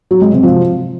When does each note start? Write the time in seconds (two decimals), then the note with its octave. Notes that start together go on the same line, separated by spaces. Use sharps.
0.11 F#3
0.22 G#3
0.32 C3
0.43 F3